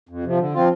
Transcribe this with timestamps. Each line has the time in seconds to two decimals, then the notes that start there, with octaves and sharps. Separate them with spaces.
0.09 F2
0.23 C3 F3
0.38 D3
0.54 F3 C4 F4